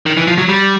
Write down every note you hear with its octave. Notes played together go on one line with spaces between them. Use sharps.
D#3
E3
F3
F#3
G3